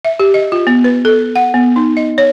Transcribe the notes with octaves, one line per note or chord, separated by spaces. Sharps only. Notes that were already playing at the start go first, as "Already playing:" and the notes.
E5
G4
D#5
F4
B3
B4
A4
F#5
B3
D#4
D#5
C#5